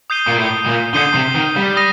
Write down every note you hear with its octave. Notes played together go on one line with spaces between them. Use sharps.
D#6 G6 C7 D#7 G7
A#2
A2
A#2
D3 D#6 G6 C7 D#7 G7
C3
D#3
G3
D#6 A#6 D#7